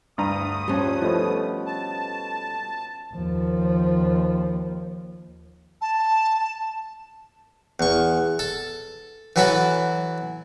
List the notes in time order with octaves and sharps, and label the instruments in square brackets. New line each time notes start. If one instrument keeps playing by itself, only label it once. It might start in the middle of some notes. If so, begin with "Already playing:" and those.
[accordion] D2 D#6 [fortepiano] G2 A#5
[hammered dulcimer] F3 D4 [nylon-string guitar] G3 C#4
[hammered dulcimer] B2 C#5 B5 [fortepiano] F3 A3
[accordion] A5
[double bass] D#2 F3
[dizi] A5
[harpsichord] E2 C#6
A4
E3 F#3 E4 F#4 A4